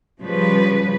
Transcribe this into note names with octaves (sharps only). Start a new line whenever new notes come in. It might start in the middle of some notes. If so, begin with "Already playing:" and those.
C#3 F3 G3 B4